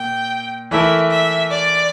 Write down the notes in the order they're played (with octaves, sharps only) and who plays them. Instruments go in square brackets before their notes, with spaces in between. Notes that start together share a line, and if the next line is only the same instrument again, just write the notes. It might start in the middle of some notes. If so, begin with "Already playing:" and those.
Already playing: [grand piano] A#2 [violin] G5
[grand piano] E3 A3 E4 A#4 [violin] E5
[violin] E5
D5